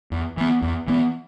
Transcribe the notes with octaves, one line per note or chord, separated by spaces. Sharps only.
E2
E3 B3
E2
E3 B3